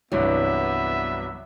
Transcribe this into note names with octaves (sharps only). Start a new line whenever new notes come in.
C2 G2 E3 F#3 B3 E5